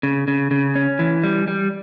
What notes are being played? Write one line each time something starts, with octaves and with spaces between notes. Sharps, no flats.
C#3
C#3
C#3
C#4
E3
G3
G3